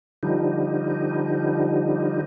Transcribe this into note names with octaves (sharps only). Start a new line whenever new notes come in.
D3 F3 G3 D#4